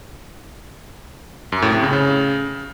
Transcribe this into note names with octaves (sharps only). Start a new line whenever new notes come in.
F#2
A2
C3
C#3
C#3